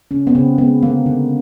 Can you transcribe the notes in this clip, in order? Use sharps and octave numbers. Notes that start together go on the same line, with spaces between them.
C#3 C#4
B3
C#3 C4
G#3 B3
D3 A#3
D3